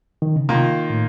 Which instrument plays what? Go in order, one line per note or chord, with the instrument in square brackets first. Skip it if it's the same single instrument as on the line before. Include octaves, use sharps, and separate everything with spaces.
[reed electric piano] D#3
C#3
[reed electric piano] C3 [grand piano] D#3 A#3 F4
[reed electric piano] A2